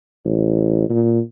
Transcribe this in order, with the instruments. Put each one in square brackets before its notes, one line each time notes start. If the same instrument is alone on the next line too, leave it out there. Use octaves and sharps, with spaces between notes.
[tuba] A1
A#2